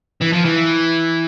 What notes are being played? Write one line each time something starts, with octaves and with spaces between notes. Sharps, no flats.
E3
F3
E3